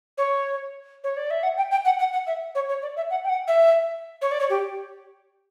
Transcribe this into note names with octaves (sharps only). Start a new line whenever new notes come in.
C#5
C#5
D5
E5
F#5
G5
G5
F#5
F#5
F#5
E5
C#5
C#5
D5
E5
F#5
G5
F#5
E5
C#5
D5
C#5
G4